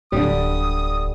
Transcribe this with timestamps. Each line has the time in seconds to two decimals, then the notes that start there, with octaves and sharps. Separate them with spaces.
0.12 D1 D3 G3 D#6